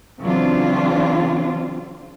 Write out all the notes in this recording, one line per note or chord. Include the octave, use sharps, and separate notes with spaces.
C#3 E3 F#3 C4 D4 F4